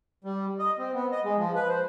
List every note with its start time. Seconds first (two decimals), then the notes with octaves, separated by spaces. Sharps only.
0.24 G3
0.59 D#5
0.79 C4
0.94 B3
1.12 D#5
1.24 G#3
1.38 F3
1.55 B4
1.69 C5